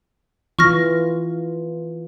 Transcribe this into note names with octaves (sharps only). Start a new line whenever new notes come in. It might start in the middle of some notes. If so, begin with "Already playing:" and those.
E3 F4 C#6 F6 A#6